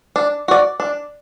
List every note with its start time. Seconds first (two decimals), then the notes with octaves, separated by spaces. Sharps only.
0.16 D4
0.48 F#4 D5
0.80 D4